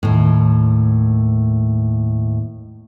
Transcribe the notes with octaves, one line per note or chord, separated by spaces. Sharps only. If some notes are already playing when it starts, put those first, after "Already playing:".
D#2 A2